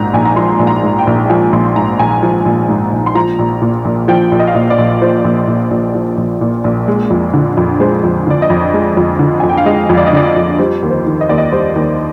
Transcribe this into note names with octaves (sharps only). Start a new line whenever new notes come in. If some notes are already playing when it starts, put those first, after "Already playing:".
Already playing: A#1 G#2 A#5
A#1 G#5
A#5
F3 C6
A#1
A#5
G#2
G5
A#1
F3 G#5
A#1 C6
G#2 A#5
A#1 G#5
F3
A#1
G#2
A#1
C6
F3 A#5
A#1
A#2
A#1
F3 G5
A#1
D#5
F5
A#2 D#5
D5
A#1
F3 C5
A#1
A#2
A#1
F3
A#1
A#2
A#1
G#3
F2
D3
F2
G#3 C5
F2
D3 D5
D#5
F2
G#3
F2
D3
F2 G#5
G5
F5
G#3 D#5
F2
D5
D#5
D3 D5
F2
G3 C5
D#2
C5
D#3
D#5
D#2 D5
D#5
G3 C5
D#2